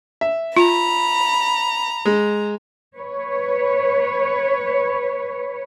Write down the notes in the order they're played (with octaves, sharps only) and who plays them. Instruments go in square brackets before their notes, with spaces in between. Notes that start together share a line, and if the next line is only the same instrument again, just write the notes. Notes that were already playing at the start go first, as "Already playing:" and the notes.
[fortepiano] E5
[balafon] F4 [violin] A#5 [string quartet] B5
[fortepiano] G#3
[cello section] B4 C#5